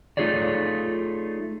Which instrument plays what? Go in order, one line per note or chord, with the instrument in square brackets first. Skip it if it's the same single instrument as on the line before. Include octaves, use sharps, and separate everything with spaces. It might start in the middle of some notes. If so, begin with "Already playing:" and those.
[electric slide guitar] A3 D#4 F4 G#4 C#5 D5